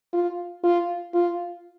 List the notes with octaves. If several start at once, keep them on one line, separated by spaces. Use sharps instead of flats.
F4
F4
F4